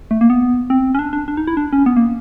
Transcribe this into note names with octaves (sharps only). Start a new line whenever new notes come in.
A3
A#3
B3
C4
C#4
D4
D4
D4
D#4
E4
D4
C#4
B3
A#3